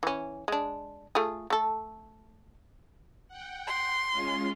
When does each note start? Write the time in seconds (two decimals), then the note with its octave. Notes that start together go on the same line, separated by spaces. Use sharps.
0.03 E3 C#4
0.48 G#3 D4
1.15 A3 F4 G#4
1.50 A3 A4
3.28 F#5 G5
3.67 C6
4.11 G#3 C#4 F4